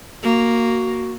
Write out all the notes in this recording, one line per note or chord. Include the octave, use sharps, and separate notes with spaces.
A#3 F#4